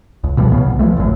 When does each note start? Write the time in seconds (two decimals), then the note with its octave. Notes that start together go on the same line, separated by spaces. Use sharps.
0.24 C#2
0.37 B2 E3 F3 G3
0.50 A2 C#3 B3
0.66 C2
0.79 E3 F3 G#3 A3
0.97 G#1 C#2 F#2 A2